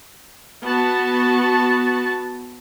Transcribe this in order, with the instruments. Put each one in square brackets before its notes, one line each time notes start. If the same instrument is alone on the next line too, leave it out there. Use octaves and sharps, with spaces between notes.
[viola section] B3 F#4 A5